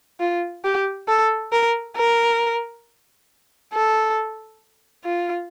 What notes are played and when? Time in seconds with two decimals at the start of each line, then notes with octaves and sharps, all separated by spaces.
0.20 F4
0.64 G4
1.08 A4
1.52 A#4
1.97 A#4
3.73 A4
5.05 F4